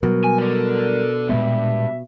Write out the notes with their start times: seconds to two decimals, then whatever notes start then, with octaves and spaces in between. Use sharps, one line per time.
0.03 B2 F#3 G3 A#4
0.24 G#5
0.38 A4 D5
1.29 G2 A#2 G#3 B3 E5